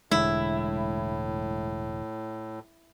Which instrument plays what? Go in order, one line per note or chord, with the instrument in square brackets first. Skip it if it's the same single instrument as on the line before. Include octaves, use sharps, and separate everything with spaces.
[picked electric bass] E1 D3 G#3 [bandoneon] A2 [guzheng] E4